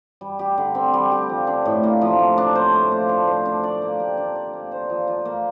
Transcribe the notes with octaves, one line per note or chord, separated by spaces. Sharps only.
G3
G4
D3
C4
G3
G4
F3
D4
A2
A#3
F3
D4
D4
C5
A3
F4
D4
C5
D4
D5
A#3
G4
D4
D5
A#3
C5
F3
F4
A#3